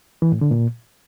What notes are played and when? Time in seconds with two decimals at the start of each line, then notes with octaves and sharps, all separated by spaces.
0.22 E3
0.32 A2
0.41 D3
0.51 A#2